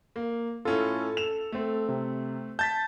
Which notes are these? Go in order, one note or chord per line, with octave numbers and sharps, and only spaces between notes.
A#3
A2 C#4 F4 A4
E7 F7
A3 C4
C3
A5 G6 A6 B6